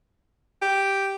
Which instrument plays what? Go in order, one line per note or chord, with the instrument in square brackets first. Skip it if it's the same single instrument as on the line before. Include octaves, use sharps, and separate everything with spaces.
[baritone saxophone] G4